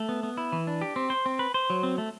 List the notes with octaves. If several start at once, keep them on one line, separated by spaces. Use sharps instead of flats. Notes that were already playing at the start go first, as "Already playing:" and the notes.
Already playing: A3
B3
B3
E4
E3
D4
G4
C4
C5
C4
B4
C5
F#3
C4
A3